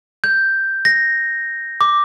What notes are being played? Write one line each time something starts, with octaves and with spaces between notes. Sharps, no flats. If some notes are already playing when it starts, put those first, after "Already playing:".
G6
A#6
D6